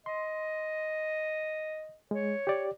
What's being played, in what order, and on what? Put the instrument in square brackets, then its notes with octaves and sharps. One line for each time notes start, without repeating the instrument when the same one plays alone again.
[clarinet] D#5 [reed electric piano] C6
[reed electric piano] G#3 [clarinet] C#5
[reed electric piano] G4 D5